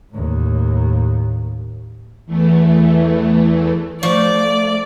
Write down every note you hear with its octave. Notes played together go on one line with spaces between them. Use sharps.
D#2 A2
E2 E3 A3
F3 A3 C5 D5 C#6